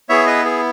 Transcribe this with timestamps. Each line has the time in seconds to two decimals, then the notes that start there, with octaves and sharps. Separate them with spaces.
0.09 B3 E4 G#4 C#5 E5
0.26 B4 D#5
0.45 G#4